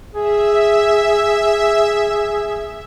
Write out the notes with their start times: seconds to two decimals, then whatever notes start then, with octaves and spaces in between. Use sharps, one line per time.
0.15 G#4 E5